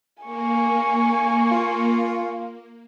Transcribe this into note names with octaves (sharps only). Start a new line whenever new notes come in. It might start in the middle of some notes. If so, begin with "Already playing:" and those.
A#3 G#5 C#6
F4